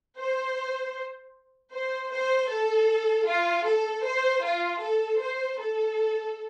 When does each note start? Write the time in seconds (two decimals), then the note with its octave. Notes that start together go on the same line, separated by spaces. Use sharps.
0.18 C5
1.72 C5
2.11 C5
2.50 A4
3.27 F4
3.66 A4
4.04 C5
4.43 F4
4.81 A4
5.20 C5
5.59 A4